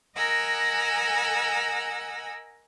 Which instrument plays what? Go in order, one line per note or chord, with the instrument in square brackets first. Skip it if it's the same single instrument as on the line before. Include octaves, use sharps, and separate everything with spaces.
[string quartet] A#4 D#5 F#5 G#5 E6